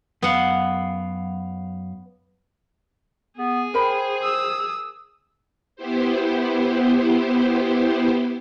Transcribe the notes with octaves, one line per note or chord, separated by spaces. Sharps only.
F#2 B3 F5 F#5
B3 G#4
A#4 C5 G5 B5
D#6 E6
B3 E4 G4 C5